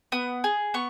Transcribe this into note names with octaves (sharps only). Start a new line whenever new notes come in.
B3 D#6
G#4
B3 C#6